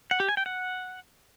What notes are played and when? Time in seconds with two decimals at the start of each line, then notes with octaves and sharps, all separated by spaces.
0.11 F#5
0.20 G4
0.29 G#5
0.37 G5
0.46 F#5